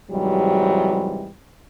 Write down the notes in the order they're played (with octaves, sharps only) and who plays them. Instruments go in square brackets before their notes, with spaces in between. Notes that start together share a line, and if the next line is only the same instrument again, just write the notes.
[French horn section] G#2 C3 E3 F#3 G3